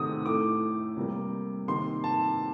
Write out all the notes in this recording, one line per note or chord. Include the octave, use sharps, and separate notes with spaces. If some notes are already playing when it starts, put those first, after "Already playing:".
Already playing: C3 D#3 A3 D#6
A2 A3 D6
C3 G3 A#3
C3 D#3 A#3 C6
A5